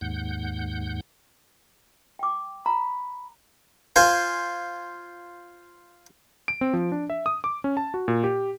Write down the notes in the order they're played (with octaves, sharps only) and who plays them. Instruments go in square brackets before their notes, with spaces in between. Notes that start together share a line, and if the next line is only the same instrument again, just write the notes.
[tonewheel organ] D#2 G#2 F#5 G6
[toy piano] G5 D6
[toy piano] A#5 [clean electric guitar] B5
[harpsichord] F4 C5 G#5
[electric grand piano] D7
C4
F3
D4
E5
D#6
D6
C#4
A5
F#4
A#2
G4